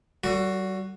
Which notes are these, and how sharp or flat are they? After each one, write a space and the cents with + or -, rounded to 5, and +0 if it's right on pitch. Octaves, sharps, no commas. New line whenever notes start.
G3 -40 F#4 +0 A4 +30